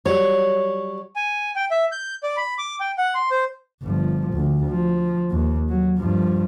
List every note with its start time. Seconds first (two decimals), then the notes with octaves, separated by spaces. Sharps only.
0.06 F#3 G3 C#5
1.16 G#5
1.56 G5
1.71 E5
1.92 G6
2.23 D5
2.37 B5
2.58 D6
2.80 G5
2.98 F#5
3.15 C6
3.31 C5
3.83 G1 F3
4.33 D2
4.69 F3
5.30 D#2
5.69 F#3
5.99 G2 F3